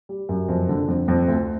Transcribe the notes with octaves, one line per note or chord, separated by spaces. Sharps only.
G3
F#2
F2
D3
F2
F2
D2